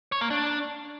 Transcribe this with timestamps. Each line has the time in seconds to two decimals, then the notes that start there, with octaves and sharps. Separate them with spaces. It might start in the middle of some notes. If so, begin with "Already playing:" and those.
0.12 C#5
0.21 A#3
0.30 D4